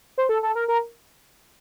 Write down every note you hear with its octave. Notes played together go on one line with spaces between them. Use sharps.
C5
A4
A4
A#4
A#4